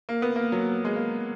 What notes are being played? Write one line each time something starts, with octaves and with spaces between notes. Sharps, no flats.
A#3
B3
A#3
F#3
G#3
A#3